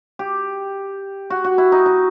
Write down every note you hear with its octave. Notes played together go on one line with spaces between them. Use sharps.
G4
F#4
F#4
E4
D#4
D#4